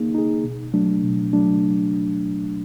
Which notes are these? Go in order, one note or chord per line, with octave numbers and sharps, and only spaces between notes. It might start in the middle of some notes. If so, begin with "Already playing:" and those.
Already playing: A#3 D#4 G#4
D#4 G#4
B2
F#3 A3 D4
B2
F#3 A3 D4